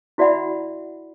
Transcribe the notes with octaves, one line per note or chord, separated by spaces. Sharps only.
E4 F#4 D5 E5 F#5 B5